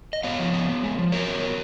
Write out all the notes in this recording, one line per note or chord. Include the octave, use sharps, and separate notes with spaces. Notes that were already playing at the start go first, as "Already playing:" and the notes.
D#5
B3 C#5 F5
F3
B3
B3
G#3
F3
F#3 A#4 C#5
B3
F#3